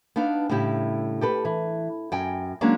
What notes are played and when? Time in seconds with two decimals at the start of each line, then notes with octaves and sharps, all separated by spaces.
0.16 B3 D4 D#4 F5
0.50 A2 C#3 G3 E4 G4
1.21 G4 A4 B4
1.45 E3
2.12 F#2 G5 G#5
2.61 F#3 G#3 A#3 C#4 D4